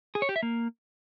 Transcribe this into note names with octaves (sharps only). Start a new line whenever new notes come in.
G#4
C#5
G4
E5
A#3